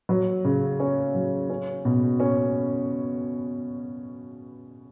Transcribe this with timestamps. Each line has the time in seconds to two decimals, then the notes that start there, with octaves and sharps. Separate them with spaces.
0.09 F#3
0.45 C#3
0.80 C#4
1.15 F#3
1.50 C#4
1.85 B2
2.20 C#4